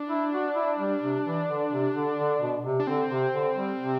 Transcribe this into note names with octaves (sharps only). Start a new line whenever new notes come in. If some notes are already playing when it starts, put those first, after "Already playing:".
Already playing: D4
E4
F#4
E4
G3
C3
E3
D3
C3
D3
D3
B2
C3
D4
D3 C4
C3
D3
G3
C3